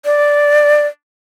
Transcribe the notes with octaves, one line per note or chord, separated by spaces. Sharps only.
D5